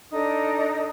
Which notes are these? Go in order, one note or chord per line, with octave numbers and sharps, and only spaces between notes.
D4 D#4 A4 D#6